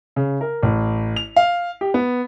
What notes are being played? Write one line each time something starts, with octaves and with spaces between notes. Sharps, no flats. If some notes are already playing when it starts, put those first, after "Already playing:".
C#3
A#4
A1
F7
F5
G4
B3